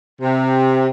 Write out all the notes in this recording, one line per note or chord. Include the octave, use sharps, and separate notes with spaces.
C3